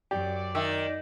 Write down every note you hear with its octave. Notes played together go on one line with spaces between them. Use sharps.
F#2 G4 D5
D#3 E5